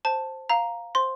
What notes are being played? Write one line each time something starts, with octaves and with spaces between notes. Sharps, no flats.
C5 A5
F5 A#5
C5 C6